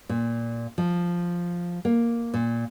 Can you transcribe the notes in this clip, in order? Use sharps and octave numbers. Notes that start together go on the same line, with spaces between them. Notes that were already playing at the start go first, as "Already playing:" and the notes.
A#2
F3
A#3
A#2